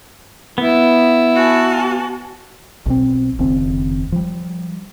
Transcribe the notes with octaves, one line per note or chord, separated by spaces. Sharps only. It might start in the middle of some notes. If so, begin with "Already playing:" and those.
B3 E4
F#4 G#5 A5
B1 B2 C4
F1 D#2 C#3 C4
F3 G3